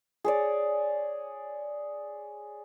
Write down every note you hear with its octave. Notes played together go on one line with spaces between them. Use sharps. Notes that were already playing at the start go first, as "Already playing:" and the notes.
G#4 C#5 D5